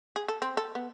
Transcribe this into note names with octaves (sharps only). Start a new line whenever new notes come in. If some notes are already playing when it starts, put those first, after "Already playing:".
G#4
A4
C4
A4
B3